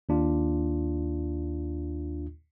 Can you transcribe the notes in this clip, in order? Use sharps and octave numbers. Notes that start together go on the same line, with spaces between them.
D#2 D4 F4